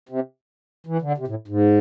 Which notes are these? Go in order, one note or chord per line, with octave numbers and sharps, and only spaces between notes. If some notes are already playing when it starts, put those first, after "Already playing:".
C3
E3
D3
C3
A2
G#2